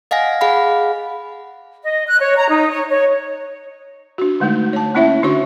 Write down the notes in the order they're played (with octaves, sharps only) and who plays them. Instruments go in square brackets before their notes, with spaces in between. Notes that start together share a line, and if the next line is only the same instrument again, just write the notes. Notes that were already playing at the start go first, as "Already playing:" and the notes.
[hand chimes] D#5 F5 F#5 G#5 A#6
G#4 F5 F#5 B5
[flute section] D#5
F#6
C#5
A#5
D#4
C#5
C#5
[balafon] D4 F#4
D3 G#3 A3 D#4
C#5 A5
A#3 C#4 E4 C#5 E5
D3 D4 F#4 C#5 C#6